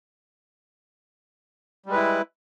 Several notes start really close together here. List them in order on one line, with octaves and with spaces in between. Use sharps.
G3 G#3 B4 E4